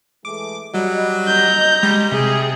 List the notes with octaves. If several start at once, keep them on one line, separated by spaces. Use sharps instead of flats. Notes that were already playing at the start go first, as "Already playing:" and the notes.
E3 G#3 A3 D6
F#3 G3 D#5
A#5 G6
G3 G#3
C3 G#4